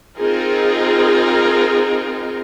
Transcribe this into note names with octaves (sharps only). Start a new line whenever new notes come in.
C4 D#4 F4 G#4 A#4